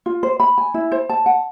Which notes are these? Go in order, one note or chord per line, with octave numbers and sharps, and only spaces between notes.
F4
C5
B5
G#5
E4
C5
A5
F#5